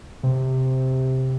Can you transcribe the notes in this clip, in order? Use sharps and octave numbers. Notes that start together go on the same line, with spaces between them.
C3